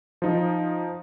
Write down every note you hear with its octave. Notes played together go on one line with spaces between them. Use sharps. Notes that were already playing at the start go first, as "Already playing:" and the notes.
F3 D#4